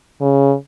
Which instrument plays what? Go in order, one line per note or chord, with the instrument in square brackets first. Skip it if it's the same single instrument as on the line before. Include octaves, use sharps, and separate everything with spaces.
[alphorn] C#3